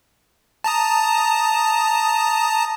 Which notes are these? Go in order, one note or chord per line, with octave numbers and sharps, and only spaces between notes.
A5 A#5 D#6